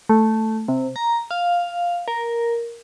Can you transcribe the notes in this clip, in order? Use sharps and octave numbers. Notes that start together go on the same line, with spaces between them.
A3
C3
A#5
F5
A#4